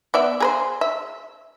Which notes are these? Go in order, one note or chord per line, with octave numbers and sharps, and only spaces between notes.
B3 D5 E5
G#4 B4 C5
E5